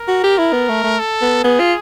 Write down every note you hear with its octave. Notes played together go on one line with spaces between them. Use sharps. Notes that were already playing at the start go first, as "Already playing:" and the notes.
Already playing: A#4
F#4
G4
E4
B3
A3
A3
A4
B3
B3 G#4
F4